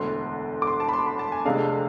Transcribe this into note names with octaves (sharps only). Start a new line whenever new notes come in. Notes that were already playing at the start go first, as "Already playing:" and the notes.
Already playing: E1 D2 D3 C6
D6
C6
A5
B5
C6
B5
A5
G#5
F1 F2 C3 G#3 D4 F5